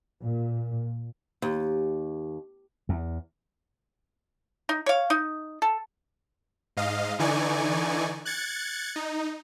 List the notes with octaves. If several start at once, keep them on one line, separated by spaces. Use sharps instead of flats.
A#2
D#2
E2
D#4
C#5 F5
D#4
A4
G#2 D#5 F5
D3 E3 D#4 D5 G#5 C#6
F#6 G#6 A6 C#7
D#4